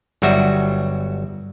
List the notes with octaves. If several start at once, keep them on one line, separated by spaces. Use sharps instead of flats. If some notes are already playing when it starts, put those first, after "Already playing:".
G1 F#3 G3 F#4 E5